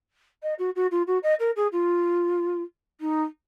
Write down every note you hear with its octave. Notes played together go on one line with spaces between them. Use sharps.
D#5
F#4
F#4
F4
F#4
D#5
A#4
G#4
F4
D#4